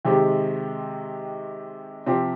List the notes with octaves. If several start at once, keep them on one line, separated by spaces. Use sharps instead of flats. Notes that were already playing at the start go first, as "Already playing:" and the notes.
C3 D#3 G#3 C4 G4
C3 F3 C4 G4 C5